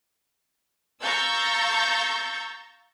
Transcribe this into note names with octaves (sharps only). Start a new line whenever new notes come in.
F5 A#5 C#6 E6 G6 A6